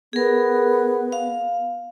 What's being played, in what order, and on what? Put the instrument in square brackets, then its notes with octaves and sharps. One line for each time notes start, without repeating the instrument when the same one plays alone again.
[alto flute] B3 [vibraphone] G#4 A#4
[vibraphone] F5